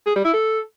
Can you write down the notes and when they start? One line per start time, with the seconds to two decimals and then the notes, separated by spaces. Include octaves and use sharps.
0.07 G#4
0.16 G3
0.24 E4
0.33 A4